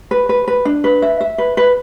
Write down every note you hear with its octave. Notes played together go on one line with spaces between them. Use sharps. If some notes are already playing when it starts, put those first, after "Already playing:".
B4
B4
B4
D4
B4
E5
E5
B4
B4